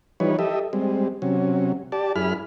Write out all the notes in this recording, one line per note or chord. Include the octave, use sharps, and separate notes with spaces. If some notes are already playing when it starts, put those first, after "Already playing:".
E3 F3 G3 D#4 B4 C#5
G4 A4 D#5 E5
G3 G#3 C4
C3 F#3 C#4
G4 D5 A5
F#2 E4 G#4 B5 F6